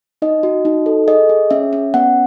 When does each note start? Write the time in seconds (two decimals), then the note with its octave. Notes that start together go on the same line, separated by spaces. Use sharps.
0.22 D#4 D#5
0.43 F#4
0.65 D#4
0.86 A4
1.08 G#4 D#5
1.29 G#4
1.50 C#4 E5
1.73 C#4
1.94 B3 F#5